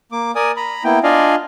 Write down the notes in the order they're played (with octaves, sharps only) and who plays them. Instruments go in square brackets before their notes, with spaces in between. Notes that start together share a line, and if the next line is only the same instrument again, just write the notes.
[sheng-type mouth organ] A#3 D6
A#4 D5 G#5 D#6
A#5 B5
A#3 B3 E4 G5
D4 F4 D5 D#5 F5 G#5